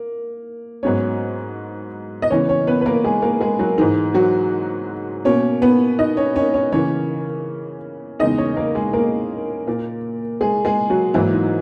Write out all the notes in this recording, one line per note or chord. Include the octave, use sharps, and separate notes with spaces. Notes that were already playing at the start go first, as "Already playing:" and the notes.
Already playing: A#3
G#2 F#3 B3 C#4 C#5
D#5
C#3 E3 B3 C#4 C#5
C#4 C#5
B3 B4
B4
A#3 A#4
G#3 G#4
A#3 A#4
G#3 G#4
F#3 F#4
G#2 E3 G#3 D#4
F#3 F#4
B2 A#3 C#4 C#5
B3 B4
D#4 D#5
C#4 C#5
C#4 C#5
C#4 C#5
C#3 E3 A#3 C#4 C#5
E2 C#3 G#3 D#4 D#5
C#4 C#5
A#3 A#4
G#3 G#4
A#3 A#4
A#2 A#3
G#3 G#4
G#3 G#4
F#3 F#4
G#2 E3 F#3 A#3 E4
D#4